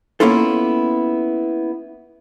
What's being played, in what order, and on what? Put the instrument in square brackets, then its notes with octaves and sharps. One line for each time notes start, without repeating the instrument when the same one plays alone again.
[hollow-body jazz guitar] A#3 B3 C#4 E4 F4 A4